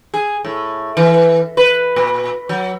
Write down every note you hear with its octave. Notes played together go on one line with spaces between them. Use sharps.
G#4
A2
E3
B4
A#2
F#3